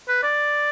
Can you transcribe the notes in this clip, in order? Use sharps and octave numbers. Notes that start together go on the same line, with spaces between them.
B4
D5